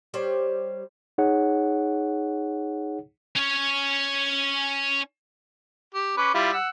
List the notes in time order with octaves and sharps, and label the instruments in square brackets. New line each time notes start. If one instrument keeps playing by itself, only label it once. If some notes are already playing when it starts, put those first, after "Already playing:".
[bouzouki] G3 C5 C#5
[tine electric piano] D#4 G#4 C#5 F#5
[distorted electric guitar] C#4 C#5
[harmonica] G4
C#4 B4 D6
G3 E4 F4
F#5 E6